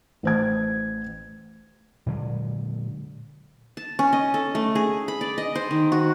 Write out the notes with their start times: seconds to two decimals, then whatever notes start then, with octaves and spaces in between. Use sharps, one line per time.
0.23 A1 C5 G#6
2.06 A#2 D3 F#3 G#3
3.77 A5
3.99 C#4
4.13 D#5
4.34 A4
4.55 A3
4.75 G#4
5.08 B5
5.21 D5
5.38 D#5
5.55 C5
5.71 D#3
5.92 F#4